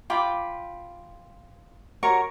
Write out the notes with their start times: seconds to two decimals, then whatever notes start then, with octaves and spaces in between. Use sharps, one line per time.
0.10 F4 G5 B5 D6
2.03 F#4 A#4 C#5 C#6